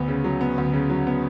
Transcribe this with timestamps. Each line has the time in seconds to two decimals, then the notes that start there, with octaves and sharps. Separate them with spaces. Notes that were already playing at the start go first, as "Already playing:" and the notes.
Already playing: D2 B3
0.08 C#3
0.24 F#3
0.41 B3
0.58 D2
0.73 C#3
0.90 F#3
1.07 B3